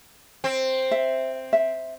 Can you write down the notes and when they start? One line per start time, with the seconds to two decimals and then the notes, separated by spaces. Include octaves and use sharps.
0.44 C4
0.91 E5
1.53 E5